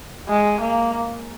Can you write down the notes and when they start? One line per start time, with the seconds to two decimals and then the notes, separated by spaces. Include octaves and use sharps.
0.29 G#3
0.60 A#3